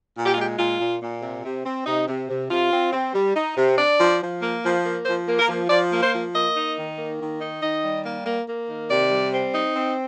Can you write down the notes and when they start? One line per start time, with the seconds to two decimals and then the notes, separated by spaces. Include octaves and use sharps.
0.16 A#2
0.26 G4
0.33 F4
0.36 G#3
0.41 G4
0.58 A#2 F4
0.79 A#2
1.00 A#2
1.22 C3
1.44 C3
1.65 C4
1.86 C3 D#4
2.08 C3
2.29 C3
2.50 C3 F4
2.71 C4
2.93 C4
3.14 G3
3.35 D#4
3.57 C3
3.78 D4 D5
3.99 F3
4.21 F3
4.42 A#3
4.64 F3
4.85 A#3
5.06 F3 C5
5.28 A#3
5.39 A#4
5.49 F3
5.70 F3 D5
5.92 A#3
6.02 C5
6.13 F3
6.34 A#3 D#5
6.56 D#4
6.77 D#3
6.98 A#3
7.20 D#3
7.40 D#4
7.62 D#3 D#5
7.83 G3
8.05 A#3
8.26 A#3
8.48 A#3
8.69 D#3
8.91 C3 D5
9.11 G3
9.32 C4
9.55 D#4
9.75 C4